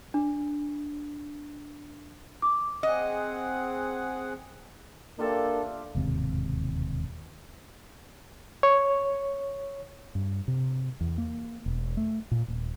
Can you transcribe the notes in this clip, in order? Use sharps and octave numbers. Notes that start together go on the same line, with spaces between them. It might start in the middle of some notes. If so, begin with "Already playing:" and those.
D4
D6
C4 G#4 D#5 F#5
A#3 D4 F4 G4 A4 E5
E1 D#2 G#2 C3
C#5
G2
C3
E2
A#3
E1
A3
A#2
D#1